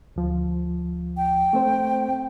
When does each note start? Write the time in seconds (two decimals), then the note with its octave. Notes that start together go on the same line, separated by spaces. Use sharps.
0.16 D2 F3
1.17 G5
1.53 A3 C4 C5